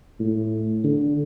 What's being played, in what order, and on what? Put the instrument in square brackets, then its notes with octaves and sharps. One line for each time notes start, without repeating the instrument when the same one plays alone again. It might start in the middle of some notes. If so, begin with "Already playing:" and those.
[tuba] A2
D3